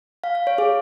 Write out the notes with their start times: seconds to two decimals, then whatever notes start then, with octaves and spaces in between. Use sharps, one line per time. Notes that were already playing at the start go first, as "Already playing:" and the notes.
0.24 F5
0.35 F5
0.47 C#5
0.58 G#4